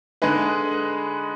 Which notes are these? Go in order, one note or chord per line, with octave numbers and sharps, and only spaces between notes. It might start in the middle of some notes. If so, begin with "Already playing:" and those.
D3 G#3 D#4 G#4 B4